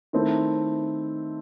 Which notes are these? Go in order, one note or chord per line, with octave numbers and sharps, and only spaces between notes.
D#3 A3 C4 E4